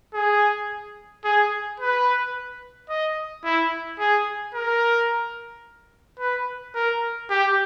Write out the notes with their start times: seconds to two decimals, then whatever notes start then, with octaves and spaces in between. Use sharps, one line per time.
0.14 G#4
1.24 G#4
1.80 B4
2.89 D#5
3.44 E4
3.99 G#4
4.54 A#4
6.19 B4
6.75 A#4
7.30 G4